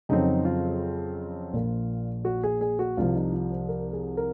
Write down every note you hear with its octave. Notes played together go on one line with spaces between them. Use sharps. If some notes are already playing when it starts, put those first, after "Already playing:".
F2 C#3 F#3 C4 D#4
F4
A#1 A#2 F3 A#3
F#4
G#4
G#4
F#4
C2 C3 F3 F4
D#4
F4
C5
A#4
G#4
A#4